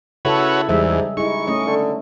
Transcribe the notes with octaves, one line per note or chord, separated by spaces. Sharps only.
C#3 E4 F#4 A4 B4 C#5
E2 G#2 G3 G#3 E5
G#3 D#4 E4 C#6
A3 C#4 D#5
D3